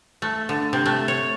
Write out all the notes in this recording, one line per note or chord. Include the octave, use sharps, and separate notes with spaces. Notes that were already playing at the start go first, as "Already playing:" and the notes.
A3
D3
C3
A3
C#5